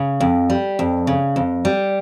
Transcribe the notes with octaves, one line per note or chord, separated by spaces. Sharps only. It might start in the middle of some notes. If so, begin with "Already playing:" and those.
Already playing: C#3
F2
G3
F2
C#3
F2
G3